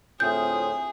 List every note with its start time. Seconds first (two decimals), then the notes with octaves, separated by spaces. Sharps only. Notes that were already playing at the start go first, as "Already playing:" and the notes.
0.20 D2 A2 C4 F4 G#4 E5 D#6 G6